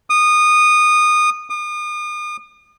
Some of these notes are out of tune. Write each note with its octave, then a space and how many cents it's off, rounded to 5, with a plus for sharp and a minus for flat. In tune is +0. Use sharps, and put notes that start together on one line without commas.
D#6 -20
D#6 -40